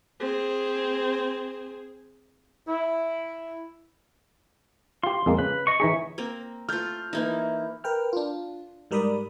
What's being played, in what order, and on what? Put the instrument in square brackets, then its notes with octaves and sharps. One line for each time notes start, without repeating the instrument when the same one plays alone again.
[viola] C4 G#4
[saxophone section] E4
[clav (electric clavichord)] F4 G4 [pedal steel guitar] C6
[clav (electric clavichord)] F2 G#3 A#3
[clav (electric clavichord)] C#3 [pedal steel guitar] B4
[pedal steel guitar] D#5 C#6
[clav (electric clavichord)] E3 D#4 G#4 [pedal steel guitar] C#5 E5 C#6
[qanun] A#3 C4 A#4
[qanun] A3 F4 [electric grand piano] F6 G6
[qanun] E3 A#3 D#4 [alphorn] E4
[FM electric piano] A#4 B4 G5 F6
D4 F4
G#2 G3 A#4 D5 B5 D#6